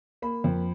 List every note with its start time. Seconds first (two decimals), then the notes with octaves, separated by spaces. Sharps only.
0.22 A#3 B5
0.44 F2